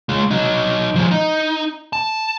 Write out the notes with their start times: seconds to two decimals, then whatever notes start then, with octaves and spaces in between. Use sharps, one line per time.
0.09 G#3 F4
0.31 F#3 D#4
0.95 F3 G#3
1.11 D#4
1.93 A5